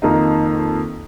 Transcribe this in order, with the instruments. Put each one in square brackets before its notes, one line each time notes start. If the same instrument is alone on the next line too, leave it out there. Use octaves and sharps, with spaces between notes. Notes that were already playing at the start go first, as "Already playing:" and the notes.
[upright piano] F2 D#3 A#3 D#4